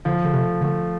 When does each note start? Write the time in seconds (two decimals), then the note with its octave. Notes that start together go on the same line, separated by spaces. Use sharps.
0.05 D3 F3
0.25 D3
0.33 C3 A3
0.61 D3 A3